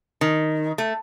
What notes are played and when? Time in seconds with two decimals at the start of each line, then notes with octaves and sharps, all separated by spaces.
0.21 D#3
0.78 A3